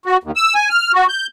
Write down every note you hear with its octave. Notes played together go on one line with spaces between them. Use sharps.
F#4
D#2
E6
G#5
F6
F#4
G6